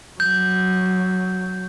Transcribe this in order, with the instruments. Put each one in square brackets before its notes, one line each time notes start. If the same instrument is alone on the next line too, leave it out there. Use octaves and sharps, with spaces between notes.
[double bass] F#3 [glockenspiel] G6